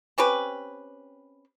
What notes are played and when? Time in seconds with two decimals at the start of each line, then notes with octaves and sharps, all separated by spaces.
0.18 C4 C#4 G4 B4